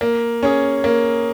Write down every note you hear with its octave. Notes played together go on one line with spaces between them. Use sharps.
A#3
C#4 G#4
A#3